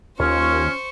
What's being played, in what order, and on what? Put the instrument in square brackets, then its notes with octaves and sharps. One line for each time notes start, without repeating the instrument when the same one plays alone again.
[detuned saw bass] D#2 [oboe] C#4 [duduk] F4 [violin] C5 C#6